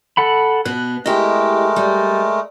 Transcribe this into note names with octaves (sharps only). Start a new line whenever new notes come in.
A4 F#5 B5
B2 B3 F#6
G#3 A3 E4 G4 A#4 D#5
G3